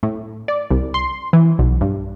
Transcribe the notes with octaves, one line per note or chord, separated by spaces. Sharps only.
A2
D5
C2
C6
E3
B1
G2